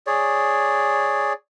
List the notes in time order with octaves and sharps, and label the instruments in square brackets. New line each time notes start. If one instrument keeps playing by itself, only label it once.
[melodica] G#4 C#5 D5